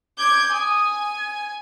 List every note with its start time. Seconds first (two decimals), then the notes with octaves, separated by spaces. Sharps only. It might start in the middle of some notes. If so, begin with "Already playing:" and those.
0.18 D6 G6 G#6
0.53 G#5 D#6
1.19 G#6